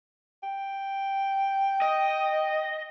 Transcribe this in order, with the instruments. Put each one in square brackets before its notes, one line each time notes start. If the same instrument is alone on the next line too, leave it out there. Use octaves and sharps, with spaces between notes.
[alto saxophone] G5
[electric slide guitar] D#5